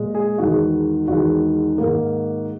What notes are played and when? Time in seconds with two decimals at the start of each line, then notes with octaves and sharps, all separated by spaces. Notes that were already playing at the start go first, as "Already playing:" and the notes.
Already playing: A#2 G#3
0.14 G#4
0.38 E2 D#3 G#3 F#4
1.08 E2 D#3 G#3 F#4
1.78 G#2 D#3 A#3